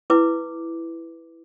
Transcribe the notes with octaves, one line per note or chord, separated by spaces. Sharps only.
E4 B4 D6